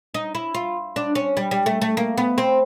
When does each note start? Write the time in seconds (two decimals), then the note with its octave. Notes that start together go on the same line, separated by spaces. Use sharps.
0.14 D#4
0.35 E4
0.55 F4
0.96 D4
1.15 C#4
1.37 G3
1.51 G3
1.66 A3
1.82 A3
1.97 A#3
2.17 B3
2.38 C4